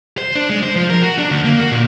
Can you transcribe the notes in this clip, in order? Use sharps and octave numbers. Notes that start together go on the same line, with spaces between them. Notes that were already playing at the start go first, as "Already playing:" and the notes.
C5
D4
G#3
C5
F3
A#4
F#4
D4
D2
A#3
F#4
A#2